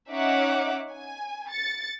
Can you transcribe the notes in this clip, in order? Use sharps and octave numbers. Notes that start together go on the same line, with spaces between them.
C#4 D#4 C#5 E5 F#5 D6
G#5
A6 C#7